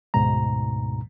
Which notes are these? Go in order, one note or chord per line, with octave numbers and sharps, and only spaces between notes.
D2 G#2 B2 A#5